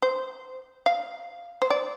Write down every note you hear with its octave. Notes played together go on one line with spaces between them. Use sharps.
C5
F5
C5
D5